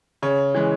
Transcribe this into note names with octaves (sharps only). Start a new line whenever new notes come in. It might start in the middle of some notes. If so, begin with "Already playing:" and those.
C#3 C#5
E3 G#3